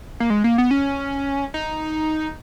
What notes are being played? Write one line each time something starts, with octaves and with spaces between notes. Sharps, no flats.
A#3
G#3
A#3
B3
C#4
D#4